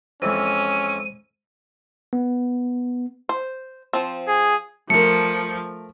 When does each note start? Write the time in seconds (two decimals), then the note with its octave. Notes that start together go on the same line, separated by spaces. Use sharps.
0.22 F2 E3 G#3 C#4 C5 D#7
2.13 B3
3.29 C5
3.93 F3 C4
4.28 G#4
4.90 F3 A3 A#4 C#7